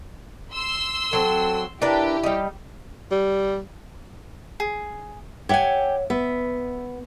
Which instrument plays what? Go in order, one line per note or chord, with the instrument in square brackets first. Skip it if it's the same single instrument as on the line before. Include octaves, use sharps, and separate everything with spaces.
[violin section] C6 E6
[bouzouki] F#3 C4 [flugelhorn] A4
[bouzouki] D4 A#4 B4 [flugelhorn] E4 [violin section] G4
[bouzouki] G3 D#4
[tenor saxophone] G3
[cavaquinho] G#4
[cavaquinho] G4 G#5 [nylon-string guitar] C#5 E5 F#5
[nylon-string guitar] B3 [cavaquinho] E5